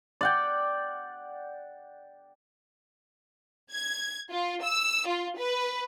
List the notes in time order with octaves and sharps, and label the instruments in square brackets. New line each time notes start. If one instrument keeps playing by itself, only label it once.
[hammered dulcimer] D5 F#5 G5
[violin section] G#6
F4
E6
F4
B4